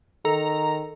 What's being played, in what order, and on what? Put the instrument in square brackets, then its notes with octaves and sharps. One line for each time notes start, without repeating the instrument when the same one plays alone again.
[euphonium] D#3 [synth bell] A4 [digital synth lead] A#5